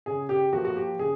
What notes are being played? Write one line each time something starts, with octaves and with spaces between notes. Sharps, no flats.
C#3 G#4
G4
F3 A#3 F#4
F#4
G4
C#3 G#4